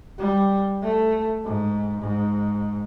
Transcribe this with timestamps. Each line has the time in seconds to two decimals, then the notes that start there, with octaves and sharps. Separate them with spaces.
0.18 G3
0.82 A3
1.44 G#2
2.02 G#2